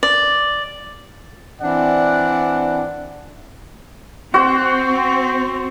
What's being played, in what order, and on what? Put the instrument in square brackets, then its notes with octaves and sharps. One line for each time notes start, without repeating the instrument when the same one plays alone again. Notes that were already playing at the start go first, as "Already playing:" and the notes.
[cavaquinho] D5
[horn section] E3 C4 D4 D5 F#5
[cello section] C4 [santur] F#4 C5